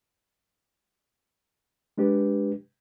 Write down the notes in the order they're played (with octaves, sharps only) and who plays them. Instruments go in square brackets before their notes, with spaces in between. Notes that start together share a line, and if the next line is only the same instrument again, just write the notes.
[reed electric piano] G#3 D4 G4 B4